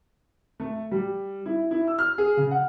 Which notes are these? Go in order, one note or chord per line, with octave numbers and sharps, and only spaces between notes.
A3
G3
E4
E4
E6
F6
G#4
C#3
F#5